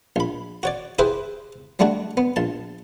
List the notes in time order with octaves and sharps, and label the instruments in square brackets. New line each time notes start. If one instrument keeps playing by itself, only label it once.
[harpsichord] A#1 B5
F#4 C#5 D5
E4 G4 G#4 B4 C5 E5
F#3 G3 A3 D4 F#4
B3
A#1 A5